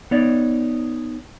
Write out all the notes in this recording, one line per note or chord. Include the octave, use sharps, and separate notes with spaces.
B3 D#4 C#5 D5